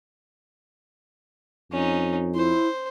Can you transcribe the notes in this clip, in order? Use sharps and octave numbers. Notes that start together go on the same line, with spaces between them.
F2 C#4 D#4
E4 C5